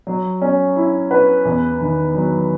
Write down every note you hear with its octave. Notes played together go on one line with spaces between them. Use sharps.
F#3
C#4
E4
B4
E2
D#3
F#3